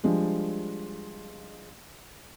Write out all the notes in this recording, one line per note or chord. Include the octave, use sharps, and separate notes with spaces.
F3 G3 G#3 D4